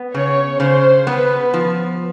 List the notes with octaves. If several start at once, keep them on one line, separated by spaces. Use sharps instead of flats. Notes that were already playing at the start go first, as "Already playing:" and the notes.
Already playing: B3
C#3 C#5
C#3 C5
B3 B4
F3